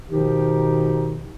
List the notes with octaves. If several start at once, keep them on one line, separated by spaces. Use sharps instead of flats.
B2 D#3 F3 D#4 G4